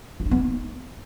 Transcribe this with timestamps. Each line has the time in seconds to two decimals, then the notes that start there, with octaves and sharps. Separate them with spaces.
0.20 F4
0.26 D#4
0.31 B3
0.37 D#4